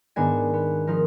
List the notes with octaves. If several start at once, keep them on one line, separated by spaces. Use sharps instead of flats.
G#2 D#3 B3 D4 G#5 A#6
B3
F3 D#4 A#4